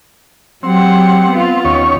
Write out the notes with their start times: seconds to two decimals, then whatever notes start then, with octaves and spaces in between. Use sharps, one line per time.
0.63 F#3 C4 G4 F#5
1.31 B3 F4
1.65 D#2 C#4 C#5